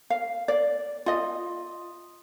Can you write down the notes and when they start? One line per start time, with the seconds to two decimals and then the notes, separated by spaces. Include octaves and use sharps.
0.10 F5
0.48 D5
1.06 F4 D#5